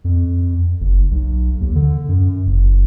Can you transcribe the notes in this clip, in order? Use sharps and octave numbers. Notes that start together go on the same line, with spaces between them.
F2
F#1
B1
D#2
D3
F#2
F#1